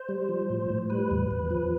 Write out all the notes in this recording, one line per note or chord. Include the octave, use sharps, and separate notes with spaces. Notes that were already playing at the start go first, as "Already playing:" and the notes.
Already playing: C5
G3
F3
A2
A2
G3 B4
E2
E2
F3